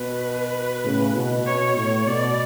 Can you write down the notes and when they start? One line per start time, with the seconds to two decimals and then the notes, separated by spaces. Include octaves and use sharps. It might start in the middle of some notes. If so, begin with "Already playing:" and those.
Already playing: B2 B4
0.85 A2 C#3
1.15 B2
1.45 B2 C#5
1.77 A2 C#5
2.07 B2 D5